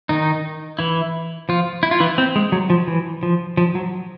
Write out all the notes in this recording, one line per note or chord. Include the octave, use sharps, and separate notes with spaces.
D#3 D#4
E3 E4
F3 F4
E4
F4
E3 E4
C4
G#3
F#3
F3
E3
F3
F3
F#3